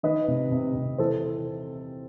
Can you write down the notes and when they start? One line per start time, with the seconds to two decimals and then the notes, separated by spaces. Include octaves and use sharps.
0.03 D#3 B4 D#5
0.28 C3
0.52 C3
0.75 C3
0.98 E3 A4 C5